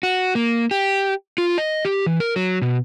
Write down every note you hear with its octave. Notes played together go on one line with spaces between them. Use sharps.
F#4
A#3
G4
F4
D#5
G4
E3
A#4
F#3
B2